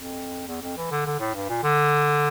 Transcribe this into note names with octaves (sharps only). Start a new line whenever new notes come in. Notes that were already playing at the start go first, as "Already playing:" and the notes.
Already playing: F2
E2
F2
E3
D3
D3
A2
G2
A#2
D3